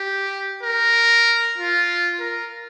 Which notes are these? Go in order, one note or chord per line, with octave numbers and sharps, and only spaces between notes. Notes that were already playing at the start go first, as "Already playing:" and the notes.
Already playing: G4
A#4
F4
A#4